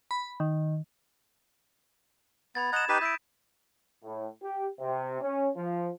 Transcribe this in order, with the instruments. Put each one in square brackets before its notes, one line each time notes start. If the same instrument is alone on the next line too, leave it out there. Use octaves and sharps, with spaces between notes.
[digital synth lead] B5
D#3
[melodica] B3 [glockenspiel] B5 G#6 A6
[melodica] D#5 F#5 A#5 [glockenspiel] G#6 E7
[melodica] D#4 G4 B4 [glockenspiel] D#6 B6 D#7
[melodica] E4 [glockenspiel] G6 B6 D7
[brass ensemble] A2
G4
C3
C#4
F3